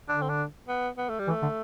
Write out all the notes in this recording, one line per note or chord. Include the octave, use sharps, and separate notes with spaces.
D3 D4
C4
D4
B3
B3
A3
G3
E3
A3
D3